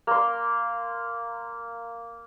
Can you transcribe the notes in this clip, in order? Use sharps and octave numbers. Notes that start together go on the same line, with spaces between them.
A#3 C6